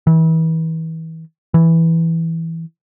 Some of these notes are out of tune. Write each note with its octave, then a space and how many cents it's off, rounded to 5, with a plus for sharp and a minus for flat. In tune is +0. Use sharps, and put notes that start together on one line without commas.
E3 -35
E3 -5